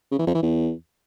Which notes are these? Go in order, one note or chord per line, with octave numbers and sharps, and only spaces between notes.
C#3
E3
F2
E3
E2